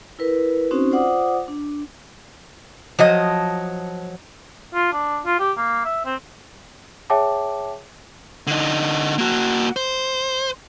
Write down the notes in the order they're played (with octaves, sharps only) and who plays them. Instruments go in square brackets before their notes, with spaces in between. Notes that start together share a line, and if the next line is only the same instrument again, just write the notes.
[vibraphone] E4 A#4 B4
C4 C#4 D#4 F#4 C5
F4 C5 D5 F#5 D6 D#6
D4
[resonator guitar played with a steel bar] F3 F#3 D#5
[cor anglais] F4
D4
F4
G4
A#3
E5
C4
[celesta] G#4 C#5 E5 G5 A5 D6
[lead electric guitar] D3 D#4
A#3 F#4
C5